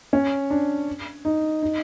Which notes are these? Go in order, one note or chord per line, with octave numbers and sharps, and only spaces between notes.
C#4
D4
D#4
D#4